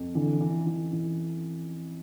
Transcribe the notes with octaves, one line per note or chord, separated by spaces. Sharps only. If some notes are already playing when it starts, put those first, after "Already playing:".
Already playing: F2
D3 E3
E3
E3
E3